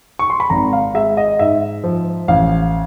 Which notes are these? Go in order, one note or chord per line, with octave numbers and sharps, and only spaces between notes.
C#6
C6
B5
G#1 A#5
F5
G#3 E5
D#5
G#2 E5
F3
A1 F5